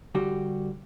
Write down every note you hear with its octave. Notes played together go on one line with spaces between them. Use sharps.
D3 G3 F#4 G4